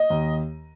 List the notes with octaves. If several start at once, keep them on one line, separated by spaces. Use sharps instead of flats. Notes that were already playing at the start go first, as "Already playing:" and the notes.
Already playing: D#5
D#2